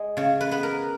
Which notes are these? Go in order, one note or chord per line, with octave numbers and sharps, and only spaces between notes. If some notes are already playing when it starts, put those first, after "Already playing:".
Already playing: G#3 D#5
C#3 C#5
B4
B3 B4
A#4